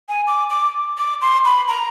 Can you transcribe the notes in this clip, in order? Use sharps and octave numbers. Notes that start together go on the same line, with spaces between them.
G#5
D6
D6
D6
C6
B5
A#5